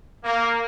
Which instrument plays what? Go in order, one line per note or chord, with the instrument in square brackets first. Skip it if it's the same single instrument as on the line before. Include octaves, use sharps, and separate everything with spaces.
[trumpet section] A#3